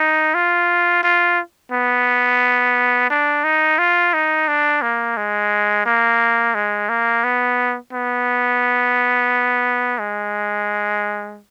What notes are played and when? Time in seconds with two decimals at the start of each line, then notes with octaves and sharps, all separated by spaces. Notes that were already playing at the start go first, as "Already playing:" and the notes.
Already playing: D#4
0.35 F4
1.03 F4
1.72 B3
3.10 D4
3.44 D#4
3.79 F4
4.14 D#4
4.48 D4
4.82 A#3
5.17 G#3
5.86 A#3
6.55 G#3
6.89 A#3
7.24 B3
7.93 B3
9.99 G#3